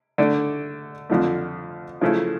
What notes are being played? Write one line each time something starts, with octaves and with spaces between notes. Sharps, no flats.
D3 A3 D4
F2 D3 F3 A3
C#3 F3 A3 E4